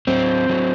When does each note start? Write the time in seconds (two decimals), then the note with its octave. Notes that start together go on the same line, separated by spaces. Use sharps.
0.07 F#3 C4
0.50 F#3